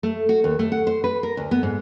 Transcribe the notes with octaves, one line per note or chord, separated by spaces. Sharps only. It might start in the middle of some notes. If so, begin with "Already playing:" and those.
A3
F#4
D#2
A3
F#5
C5
B4
A#4
D2
B3
G#2